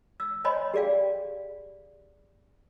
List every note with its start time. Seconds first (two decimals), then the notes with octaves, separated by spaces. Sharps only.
0.20 E6
0.44 C5 C#5 D#5 G#5 B5 C6
0.74 G4 G#4 D5 F5 G5